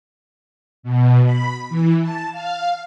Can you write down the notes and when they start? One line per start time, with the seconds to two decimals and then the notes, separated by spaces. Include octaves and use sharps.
0.83 B2
1.24 B5
1.69 E3
2.01 A5
2.32 F5